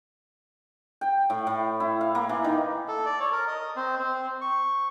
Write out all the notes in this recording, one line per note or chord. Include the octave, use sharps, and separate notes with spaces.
G5
A2
A2
E4
F5
A#3
E3
D#3
A4
D5
C#5
A#4
D#5
C4
C4
C#6